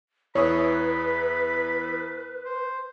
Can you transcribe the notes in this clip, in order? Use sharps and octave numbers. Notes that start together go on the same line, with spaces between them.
E2 E4 B4 C#5 E5 B5 D#6
C5